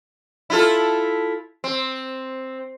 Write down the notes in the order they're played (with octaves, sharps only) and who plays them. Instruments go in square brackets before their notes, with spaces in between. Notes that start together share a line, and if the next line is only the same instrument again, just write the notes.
[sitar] E4 F4 A4
C4